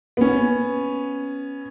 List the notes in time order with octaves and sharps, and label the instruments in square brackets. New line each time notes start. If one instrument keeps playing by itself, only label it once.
[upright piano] B3 C#4